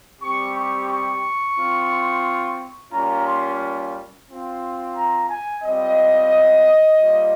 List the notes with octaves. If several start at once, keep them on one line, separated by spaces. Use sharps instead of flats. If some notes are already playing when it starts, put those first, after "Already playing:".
G3 C4 G4 C#6
C#6
C#6
C4 F4
G3 A#3 C#4 F4 A#5
C6
C4 F4
A#5
G#5
G3 C4 F4 D#5
G3 A#3 F4